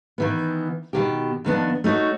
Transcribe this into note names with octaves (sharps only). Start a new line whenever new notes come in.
D#3 E3 B3
B2 D#3 G4
F2 D#3 B3 D4
A3 D#4 F#4 C#5